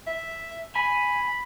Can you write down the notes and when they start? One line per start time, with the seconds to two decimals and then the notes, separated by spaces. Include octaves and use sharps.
0.07 E5
0.76 G#5 B5